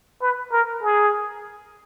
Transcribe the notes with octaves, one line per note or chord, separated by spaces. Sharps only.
B4
A#4
G#4